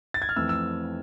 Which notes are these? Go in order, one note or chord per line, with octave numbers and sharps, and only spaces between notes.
A6
G#6
F6
F2 E3 A3 C4 E6
E6